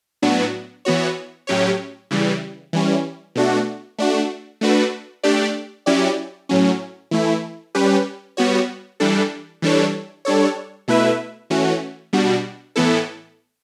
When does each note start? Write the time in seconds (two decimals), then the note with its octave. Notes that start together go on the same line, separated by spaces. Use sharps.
0.22 A2 F#3 B3 D4 F#4
0.85 E3 B3 F#4 C#5
1.47 A2 F#3 C#4 G4 C#5
2.11 C#3 E3 G3
2.73 E3 G3 C#4
3.35 B2 A3 D4 F#4
3.99 A3 D4 F#4
4.61 A3 D4 F#4 B4
5.23 A3 D4 G4 D5
5.86 F#3 C#4 E4 G4 D5
6.49 A2 F#3 C#4
7.11 E3 A3 E4
7.75 G3 C#4 G4 B4
8.37 G3 B3 F#4 C#5
9.00 E3 G3 D4 A4
9.62 E3 G3 D4 A4 C#5
10.25 G3 D4 A4 C#5
10.88 B2 A3 E4 B4 E5
11.50 E3 A3 C#4 F#4
12.13 B2 G3 D4 F#4
12.76 A2 E3 B3 E4 A4